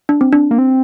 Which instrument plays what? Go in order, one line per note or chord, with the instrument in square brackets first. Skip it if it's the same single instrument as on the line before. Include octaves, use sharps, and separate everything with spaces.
[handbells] D4
C4
D4
[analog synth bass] A#3
C4